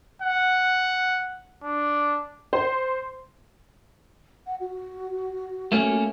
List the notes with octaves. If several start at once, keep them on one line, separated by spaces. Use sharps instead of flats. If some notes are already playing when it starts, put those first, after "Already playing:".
F#5
D4
C5
F#5
F#4
A3 A#3 C#4